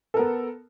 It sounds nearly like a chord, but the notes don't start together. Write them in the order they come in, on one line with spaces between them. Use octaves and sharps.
A4 A#4 B3